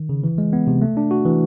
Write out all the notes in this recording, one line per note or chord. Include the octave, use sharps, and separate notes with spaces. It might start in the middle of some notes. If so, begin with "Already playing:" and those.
Already playing: D#3
C#3
E3
G#3
B3
C3
A3
D4
F#4
E3